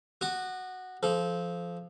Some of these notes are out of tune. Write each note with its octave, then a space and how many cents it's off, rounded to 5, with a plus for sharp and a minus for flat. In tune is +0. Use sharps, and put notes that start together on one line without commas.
F#4 +0 D#6 -45
F3 -10 A4 -25